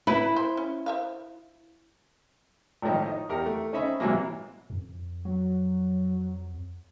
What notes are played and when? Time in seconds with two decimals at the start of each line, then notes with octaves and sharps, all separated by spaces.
0.07 A3 E4 B4 B5
0.36 C5
0.57 C#4
0.86 C5 E5 F5
2.82 G#1 A2 D#3 F3 D#5
3.04 D#4
3.29 E2 G4 A#4
3.46 A3
3.73 C4 C#4 D#4 E5 B5
4.00 G#2 C3 E3 F#3 A#3
4.70 F2
5.25 F#3